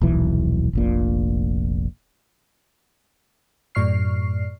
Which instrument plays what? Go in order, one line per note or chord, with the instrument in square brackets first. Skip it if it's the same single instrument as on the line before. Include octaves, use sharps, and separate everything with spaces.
[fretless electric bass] D#1 B1 E3
F1 A#1 A#2
[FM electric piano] F#2 A2 D5 C#6 F6 C7